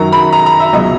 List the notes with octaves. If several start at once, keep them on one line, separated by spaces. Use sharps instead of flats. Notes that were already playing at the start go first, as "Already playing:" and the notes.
Already playing: F#2 D#3 F#3 A#5
B5
A#5
A#5
E5
C#2 B2 F#3 D#5